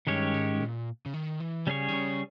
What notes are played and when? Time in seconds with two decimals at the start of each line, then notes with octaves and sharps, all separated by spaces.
0.07 G2 D#3 G#3 C#4 G4 C#5
0.34 G#2
0.54 G#2
0.60 A#2
1.06 C#3
1.13 D#3
1.40 E3
1.67 C#3 G3 C#4 G#4 C#5
1.88 D#3
1.93 C#3